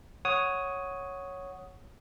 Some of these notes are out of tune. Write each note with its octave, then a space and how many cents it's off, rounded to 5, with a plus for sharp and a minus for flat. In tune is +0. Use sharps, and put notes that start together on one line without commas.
C#5 +0 F#5 +0 D#6 +10